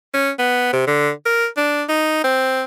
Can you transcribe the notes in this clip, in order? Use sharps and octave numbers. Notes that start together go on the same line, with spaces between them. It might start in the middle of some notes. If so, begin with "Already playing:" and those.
C#4
B3
C3
D3
A#4
D4
D#4
C4